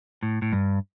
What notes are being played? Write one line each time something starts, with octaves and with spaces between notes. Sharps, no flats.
A2
A2
G2